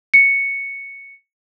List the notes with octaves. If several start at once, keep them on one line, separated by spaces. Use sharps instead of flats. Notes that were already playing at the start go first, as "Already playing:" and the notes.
C#7